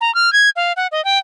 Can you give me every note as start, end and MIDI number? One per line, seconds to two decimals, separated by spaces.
0.01 0.13 82
0.15 0.32 89
0.33 0.49 92
0.56 0.73 77
0.76 0.87 78
0.92 1.03 75
1.05 1.18 79